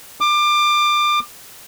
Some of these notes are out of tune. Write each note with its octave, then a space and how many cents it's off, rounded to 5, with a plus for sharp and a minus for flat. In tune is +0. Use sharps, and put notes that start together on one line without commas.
D6 +25